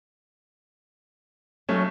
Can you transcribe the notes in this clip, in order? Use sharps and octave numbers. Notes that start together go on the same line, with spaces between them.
B1 F#3 A3 C#4